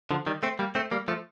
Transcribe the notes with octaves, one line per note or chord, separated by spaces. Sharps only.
D3 F3
D#3 G3
A3 C4
G3 A#3
A3 C4
G3 A#3
F3 A3